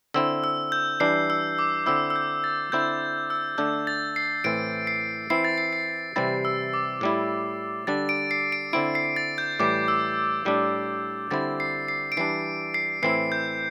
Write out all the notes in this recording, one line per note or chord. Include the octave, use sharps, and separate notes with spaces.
D3 C4 E4 E6
E6
G6
E3 G3 D4 C7
E6
D6
D3 C4 E4 E6
E6
G6
A6
D3 C4 E4 G6
E6
D3 A3 D4 G6
A6
C7
A2 E3 C4 D7
C7
E3 C4 E4 C7
A6
C7
C7
C3 E3 G3 C4 E4 A6
E6
D6
A2 G3 E4
D3 G3 D4 A6
D7
C7
D7
D3 C4 E4 D7
C7
A6
G6
A2 E3 G3 D6
E6
A2 G3 D4
D3 G3 C4 E4 A6
C7
C7
D7
E3 G3 D4 C7
C7
A2 E3 C4 E4 C7
G6